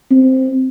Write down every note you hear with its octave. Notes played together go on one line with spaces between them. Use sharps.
C4